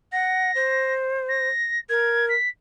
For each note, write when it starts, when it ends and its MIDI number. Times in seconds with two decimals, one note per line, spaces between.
0.12 0.51 78
0.12 0.93 94
0.55 1.49 72
1.29 1.79 94
1.89 2.33 70
1.89 2.26 92
2.29 2.49 95